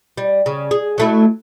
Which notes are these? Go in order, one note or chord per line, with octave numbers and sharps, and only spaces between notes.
G3
C#3
G#4
F#3 A3 E4